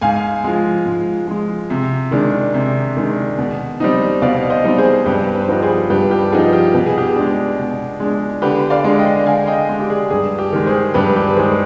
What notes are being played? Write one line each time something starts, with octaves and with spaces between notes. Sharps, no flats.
G#2 F5 G#5
F3 G#3
G#2
F3 G#3
C3
D#3 G#3 D4
C3
D#3 G#3 D4
B2
G3 C4 D#4
B2 D5 F5
C5 D#5
G3 C4 D#4
G#4 C5
G2 G4 B4
B4
C5
F3 B3 D#4 G4 B4
G#4 C5
G2 G4 B4
G4
F3 B3 D#4 G#4
G4
B2 B4
G#4
G4
G#4
G#3 D4
B2
G#3 D4
D3 G4 B4
D5 F5
G#3 D4
D#5 G5
D3 F5 G#5
D#5 G5
G#3 D4
G4
G#4
G2 G#4
G4
D#3 G#3
G#4 C5
G2 G4 B4
G4 B4
D#3 G#3 G#4 C5